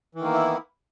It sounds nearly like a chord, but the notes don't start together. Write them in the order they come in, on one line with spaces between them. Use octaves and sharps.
E3 D#3 A#3 B3 E4